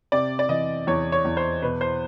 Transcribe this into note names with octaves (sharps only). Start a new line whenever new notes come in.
C3 D5
D5
E3 D#5
E2 C#5
C#5
E2
C5
B2 B4
C5